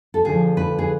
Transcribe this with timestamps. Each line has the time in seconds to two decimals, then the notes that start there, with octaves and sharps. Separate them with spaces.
0.14 A4
0.25 D2 D3 F3 G#4
0.57 B4
0.79 G#4